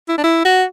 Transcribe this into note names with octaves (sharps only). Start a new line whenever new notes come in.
E4
D4
E4
F#4